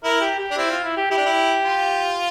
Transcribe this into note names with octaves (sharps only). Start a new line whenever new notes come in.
E4 A#4
G4
G4
D4
C4 E4
F4
E4
G4
E4 G4
D4
E4
F4